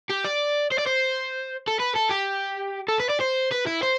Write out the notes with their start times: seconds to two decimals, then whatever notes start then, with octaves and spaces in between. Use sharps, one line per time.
0.10 G4
0.25 D5
0.72 C5
0.79 D5
0.87 C5
1.68 A4
1.80 B4
1.96 A4
2.11 G4
2.88 A4
3.00 B4
3.09 D5
3.20 C5
3.51 B4
3.66 E4
3.82 C5